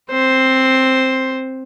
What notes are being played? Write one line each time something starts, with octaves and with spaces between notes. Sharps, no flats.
C4 C5